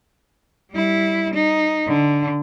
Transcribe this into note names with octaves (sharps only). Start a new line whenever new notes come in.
G3 E4
D#4
D3